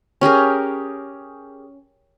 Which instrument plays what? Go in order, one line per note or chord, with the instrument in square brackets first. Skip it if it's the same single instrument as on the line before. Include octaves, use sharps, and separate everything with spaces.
[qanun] C#4 G4 G#4 A#4